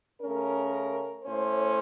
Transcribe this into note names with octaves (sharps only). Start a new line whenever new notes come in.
C#3 A3 C#4 A#4
A2 A3 C#4 C5